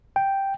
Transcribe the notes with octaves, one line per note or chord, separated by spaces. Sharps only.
G5